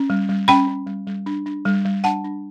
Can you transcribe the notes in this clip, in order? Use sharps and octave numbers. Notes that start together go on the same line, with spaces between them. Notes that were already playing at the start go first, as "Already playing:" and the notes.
Already playing: C#4
G3
G3
C#4 G5 B5
C#4
G3
G3
D4
D4
G3
G3
D4 F#5 A5
D4